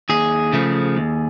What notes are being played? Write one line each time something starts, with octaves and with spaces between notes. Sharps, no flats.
D#2 G#4
C#3 F3 A3
D#2